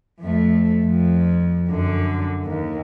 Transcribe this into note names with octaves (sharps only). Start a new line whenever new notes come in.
F2 A3
F2
F#2 D3
D#2